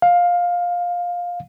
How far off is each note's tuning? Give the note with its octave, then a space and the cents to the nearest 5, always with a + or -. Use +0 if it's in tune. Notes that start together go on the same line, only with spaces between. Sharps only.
F5 +15